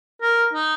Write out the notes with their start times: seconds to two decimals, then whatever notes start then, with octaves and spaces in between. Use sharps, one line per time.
0.22 A#4
0.53 D#4